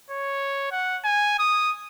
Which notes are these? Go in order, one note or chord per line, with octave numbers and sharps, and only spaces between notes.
C#5
F#5
G#5
D#6